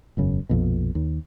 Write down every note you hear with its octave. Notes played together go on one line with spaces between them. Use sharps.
E1 F#2 C#3
A#1 F2 B2
D#2